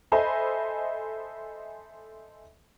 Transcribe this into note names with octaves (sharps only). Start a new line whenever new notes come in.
A4 C5 D#5 E5 G#5 B5